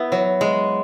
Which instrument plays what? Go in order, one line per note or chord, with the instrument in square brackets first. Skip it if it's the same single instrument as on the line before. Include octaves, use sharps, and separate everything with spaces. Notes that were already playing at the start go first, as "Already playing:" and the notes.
Already playing: [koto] B3 E4
F#3
G#3